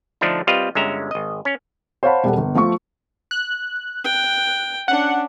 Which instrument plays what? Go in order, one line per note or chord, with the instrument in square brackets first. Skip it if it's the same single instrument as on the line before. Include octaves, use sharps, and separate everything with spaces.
[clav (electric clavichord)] D3 F3 A3 D4 D#4
G3 C4 F4 B4 D#5 F5
G1 D3 G#3 C#4 E5 A#5
G#1 D#5
C#4
[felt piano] C5 C#5 F5 F#5 A5 B5
E1 G3 A4 F#5
G1
F3 A3 F4 C#6
[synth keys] F#6
[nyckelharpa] G5
[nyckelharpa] C#4 D4 [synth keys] F#5